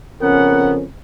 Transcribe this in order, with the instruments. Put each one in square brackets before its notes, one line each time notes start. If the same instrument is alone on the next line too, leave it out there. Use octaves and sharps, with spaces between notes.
[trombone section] F2 C#3 C#4 [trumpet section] B3 F#5 [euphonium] A#4